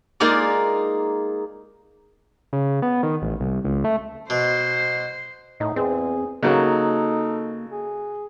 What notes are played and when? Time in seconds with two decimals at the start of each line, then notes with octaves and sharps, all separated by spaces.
0.20 G#3 A#3 D#4 F4 G#4 D5
2.53 C#3
2.82 B3
3.03 D#3
3.22 A1
3.40 C2
3.64 C#2
3.84 A3
4.30 B2 C5
5.60 A2 D#4
5.76 E2 C4 G#4
6.43 C#3 F#3 A#3 D#4 A4
7.71 G#4